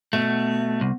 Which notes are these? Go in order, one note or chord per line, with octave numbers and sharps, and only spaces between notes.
B2 A3
C2